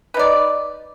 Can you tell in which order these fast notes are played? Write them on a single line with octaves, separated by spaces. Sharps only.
B4 D#4 D5